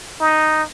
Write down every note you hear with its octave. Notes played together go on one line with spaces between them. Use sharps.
D#4